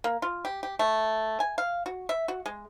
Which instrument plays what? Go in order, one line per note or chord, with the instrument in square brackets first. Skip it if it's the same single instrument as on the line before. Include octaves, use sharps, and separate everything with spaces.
[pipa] A#3
F4
G4
G4
A3
G#5
F5
F#4
E5
F#4
G#3